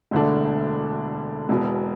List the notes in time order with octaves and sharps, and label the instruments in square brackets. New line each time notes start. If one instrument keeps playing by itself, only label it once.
[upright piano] E1 D2 D3 A3 D4
E1 E2 B2